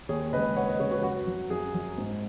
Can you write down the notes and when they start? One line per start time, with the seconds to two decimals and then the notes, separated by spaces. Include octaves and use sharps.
0.09 D#2 G#4 C#5
0.33 C#3 B4 D#5
0.37 G#3
0.56 D#2 C#5 F#5
0.69 B4 D#5
0.79 C#3 G#3 G#4 C#5
0.91 F#4 B4
1.03 F#2 F#4
1.27 F#3
1.50 F#2 G#4
1.74 F#3
1.98 G#2